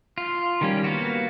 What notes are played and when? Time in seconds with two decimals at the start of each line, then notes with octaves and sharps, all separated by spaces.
0.18 F4
0.61 D#3 G3 C#4
0.84 A#3 B3 F#4